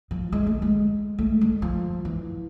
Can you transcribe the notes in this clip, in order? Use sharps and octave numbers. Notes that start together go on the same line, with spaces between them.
F3
G#3
A3
G#3
A3
G#3
F3
E3